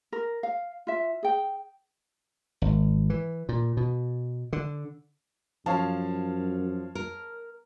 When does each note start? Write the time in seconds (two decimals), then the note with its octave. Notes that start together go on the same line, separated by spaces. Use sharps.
0.12 A#4
0.43 F5
0.87 F4 E5
1.23 G#4 G5
2.62 G#1
3.10 E3
3.49 A#2
3.77 B2
4.53 D3
5.66 F#2 F3 C#5 F5 A5
6.95 A#4